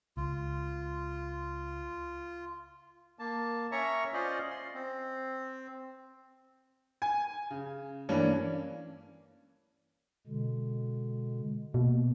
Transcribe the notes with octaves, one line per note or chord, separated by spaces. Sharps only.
C#2 F4
A#3 A5
C#4 C#5 E5 A#5 C#6
C#4 F4 C5 D5 D#5
C6
C4
G#5
C#3
G2 E3 A#3 C#4 D4
B2 D3 G#3
B2 A#3